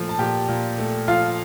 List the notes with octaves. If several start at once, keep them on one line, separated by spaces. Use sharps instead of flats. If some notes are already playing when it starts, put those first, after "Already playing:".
Already playing: A#2 F3 A3
A5
A#2 G4 G5
A#2
A3
F3 F4 F5